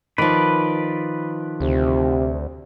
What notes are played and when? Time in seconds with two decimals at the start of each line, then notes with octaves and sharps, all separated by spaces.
0.18 D#3 F3 B4 D5
1.60 D2 C3